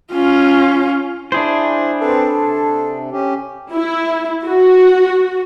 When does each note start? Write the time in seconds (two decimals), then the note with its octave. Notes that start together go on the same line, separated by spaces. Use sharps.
0.13 C#4 F4
1.32 D4 E4 G#4 C5
2.01 C4 A4 B4
2.41 C3
3.11 C#4 G4
3.74 E4
4.44 F#4